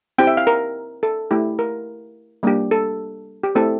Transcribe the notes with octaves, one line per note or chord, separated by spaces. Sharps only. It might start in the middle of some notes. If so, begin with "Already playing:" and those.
C4 E4 G4 G5
E5
F5
A#4
A4
A3 E4 G4
A#4
G3 A#3 D4 G4
A4
G4
A3 C4 E4 G4 A4